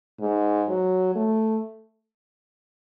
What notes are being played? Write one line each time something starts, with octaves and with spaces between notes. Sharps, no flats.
G#2
F#3
A3